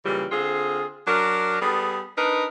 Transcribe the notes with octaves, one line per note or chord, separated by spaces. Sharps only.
A#2 C#3 E3 G3
D3 C4 F4 G#4
F#3 D4 A#4
G3 B3 G#4 A4
D4 D#4 A#4 B4